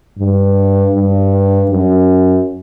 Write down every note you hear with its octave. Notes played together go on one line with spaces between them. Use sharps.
G2
G2
F#2